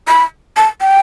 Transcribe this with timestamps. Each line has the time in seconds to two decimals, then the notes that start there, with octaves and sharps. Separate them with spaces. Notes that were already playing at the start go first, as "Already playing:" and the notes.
0.08 B5
0.57 A5
0.81 G5